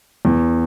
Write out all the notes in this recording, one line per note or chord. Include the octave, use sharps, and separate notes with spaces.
E2